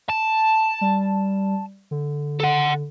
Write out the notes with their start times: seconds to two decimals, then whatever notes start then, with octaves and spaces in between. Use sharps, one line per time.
0.10 A5
0.81 G3
1.91 D3
2.40 A4 F#5